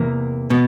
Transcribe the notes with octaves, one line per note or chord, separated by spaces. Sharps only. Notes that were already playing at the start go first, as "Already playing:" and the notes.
Already playing: E2 C3 E3 A#3
B2 B3